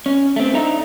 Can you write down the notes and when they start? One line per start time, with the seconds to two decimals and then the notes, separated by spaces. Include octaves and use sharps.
0.06 C#4
0.36 A3 C4
0.54 D4 D#4 E5 A#5